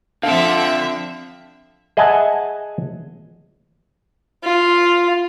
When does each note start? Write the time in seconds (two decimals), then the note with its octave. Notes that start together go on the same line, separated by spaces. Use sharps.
0.23 D3 F3 C4 A4 E5 F5
0.57 E5
1.97 G#4 D#5 E5 F#5 G#5 A5
4.44 F4